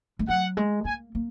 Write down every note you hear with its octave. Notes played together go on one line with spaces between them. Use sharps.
G#3
F#3 F#5
G#3
A#3 G#5
A#3